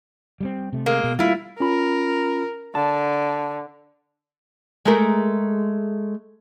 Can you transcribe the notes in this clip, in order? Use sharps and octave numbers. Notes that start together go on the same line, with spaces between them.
G3 G#3 C4
C3 A3
G#3 A#3
B2
G3 A3 A#3 E4 F4
C#4 F4 A#4 B5
D3 A5
G#3 A3 A#4